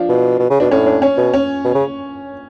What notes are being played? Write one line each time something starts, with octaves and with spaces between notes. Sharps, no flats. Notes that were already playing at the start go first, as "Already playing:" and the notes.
Already playing: F3 D4 F4
B2
B2
C#3
B2 D4
A2 C#4
D4
C#4 C#5
B2
C#4 C#5
B2
C#3